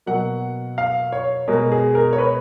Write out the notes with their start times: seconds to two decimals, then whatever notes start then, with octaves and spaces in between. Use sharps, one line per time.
0.06 B2 F#3 A#3 F#5
0.78 F5
1.12 C#5
1.48 B2 G#3 A#4
1.72 G#4
1.95 A#4
2.13 C#5
2.18 B4